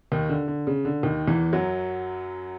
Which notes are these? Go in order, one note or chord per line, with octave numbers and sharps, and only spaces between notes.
D#2 D#3
D3
D3
C#3
D3
D#2 D#3
E2 E3
F#2 F#3